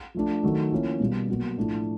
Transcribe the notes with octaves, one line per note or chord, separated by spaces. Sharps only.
F3 A3 D4
D#3 F#3 A3
F3 A#3 C#4 E4
B2 G3 A#3
B2 F#3 A#3
A2 F3 A3 D4